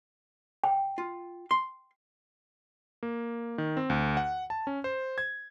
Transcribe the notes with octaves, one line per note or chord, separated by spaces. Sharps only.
G5
F4
C6
A#3
D#3
C4
D2
F#5
A5
C#4
C5
G#6